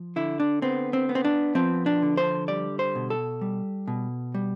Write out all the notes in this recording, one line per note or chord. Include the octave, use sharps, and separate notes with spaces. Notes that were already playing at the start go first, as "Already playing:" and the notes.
Already playing: F3
D3 E4
D4
B3 C4
C4
B3
C4
D4
F3 C4
D4
D3
C5
G3 D5
C5
B2
A4
G3
B2
G3